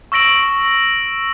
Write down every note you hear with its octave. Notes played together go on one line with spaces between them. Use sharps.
C#6 E6 A#6 D7 F#7